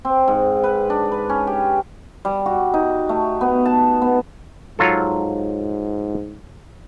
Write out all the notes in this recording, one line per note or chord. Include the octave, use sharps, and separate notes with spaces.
C4
G#2
B4
D4
B4
C#4
G4
G3
F#4
D#4
A3
B3
A5
B3
G#2 F#3 F4 A4